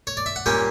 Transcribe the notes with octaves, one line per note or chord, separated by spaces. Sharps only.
C#5
D5
E5
F#5
A#2 G3 A#3 C#4 G5